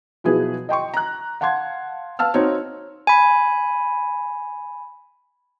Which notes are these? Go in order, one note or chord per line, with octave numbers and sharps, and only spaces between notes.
B2 F3 F#3 E4 G#4 B4
D#5 G5 C6 C#6
A#5 F#6
F5 F#5 A5 C6 G#6
B4 F5 A5 E6 F6
C4 D#4 F#4 C#5
G#5 B5